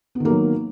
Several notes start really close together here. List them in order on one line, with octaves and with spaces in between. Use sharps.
B3 D#3 A#3 F#3